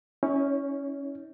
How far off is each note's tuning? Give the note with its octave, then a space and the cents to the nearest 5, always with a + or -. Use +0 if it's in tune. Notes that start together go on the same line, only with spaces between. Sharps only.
C#4 +0 E4 -40 C#5 +30